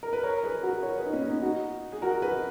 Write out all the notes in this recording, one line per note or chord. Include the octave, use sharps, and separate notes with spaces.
A#4
B4
A#4 C#5
G#4 B4
F#4 A#4
A#4 C#5
G#4 B4
D#4
A#3 C#4
B3 D#4
D#4 F#4
G#4
F#4 A#4
G#4 B4